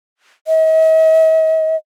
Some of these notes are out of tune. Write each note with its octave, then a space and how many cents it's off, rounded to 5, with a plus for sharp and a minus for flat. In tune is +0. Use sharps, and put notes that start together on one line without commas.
D#5 +45